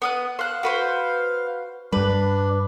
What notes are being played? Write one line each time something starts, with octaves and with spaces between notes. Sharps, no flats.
B3 D#6 F#6
C5 F5 F#6
F#4 B4 C5
G2 G3 D4 B4